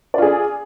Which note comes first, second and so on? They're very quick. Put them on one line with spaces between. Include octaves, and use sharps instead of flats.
D5 F4 G#4